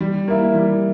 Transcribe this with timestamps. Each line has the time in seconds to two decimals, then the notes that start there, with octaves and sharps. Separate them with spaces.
0.01 G3
0.28 A#3 E4
0.55 G3